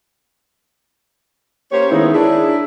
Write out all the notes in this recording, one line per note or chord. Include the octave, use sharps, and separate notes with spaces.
A#3 C#4 G4 C5 C#5
D#3 G#3 B3 D#4 E4 A#4
D4 E4 G#4